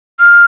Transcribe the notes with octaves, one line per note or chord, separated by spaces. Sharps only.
F6